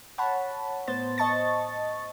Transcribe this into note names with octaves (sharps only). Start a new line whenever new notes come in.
C#5 F#5 A5 B5
A2 B3 C5 A6
D#5 A5 C#6 A6